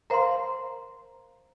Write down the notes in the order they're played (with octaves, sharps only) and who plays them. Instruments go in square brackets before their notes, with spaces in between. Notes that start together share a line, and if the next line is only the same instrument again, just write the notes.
[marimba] A#4 C5 F5 [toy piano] A#5 C6